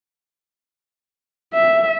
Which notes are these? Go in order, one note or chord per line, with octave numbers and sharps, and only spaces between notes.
E5